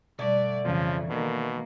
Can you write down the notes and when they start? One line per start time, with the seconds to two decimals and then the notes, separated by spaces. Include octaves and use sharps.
0.19 B2 D3 G3 A3 D5
0.65 F2 C#3 E3 F3
1.10 B2 D#3 A#3